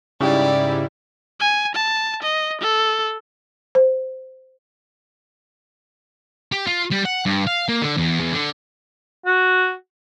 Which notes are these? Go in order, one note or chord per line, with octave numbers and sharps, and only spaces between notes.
G#2 C#3 G3 E4 G4 D5
G#5
A5
D#5
A4
C5
G4
F4
G3
F#5
G2
F5
A#3
D3
E2
E2
D3
F#4